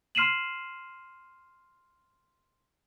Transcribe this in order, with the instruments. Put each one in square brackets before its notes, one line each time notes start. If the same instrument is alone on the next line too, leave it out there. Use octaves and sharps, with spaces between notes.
[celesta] C6 F6 C7 D#7 E7 F#7